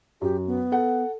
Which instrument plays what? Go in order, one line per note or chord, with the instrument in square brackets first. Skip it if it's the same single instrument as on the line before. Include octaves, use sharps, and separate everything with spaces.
[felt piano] F#2 [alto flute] G4
[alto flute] B3
[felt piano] A4 F#5